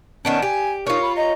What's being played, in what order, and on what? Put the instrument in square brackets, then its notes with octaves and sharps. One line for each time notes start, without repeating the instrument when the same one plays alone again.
[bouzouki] D#3 B3 D4 [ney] C#4
[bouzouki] G4 [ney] G#5
[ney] D#4 [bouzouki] F4 C#5 [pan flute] A#4
[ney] B5
[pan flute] D#5 [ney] A#5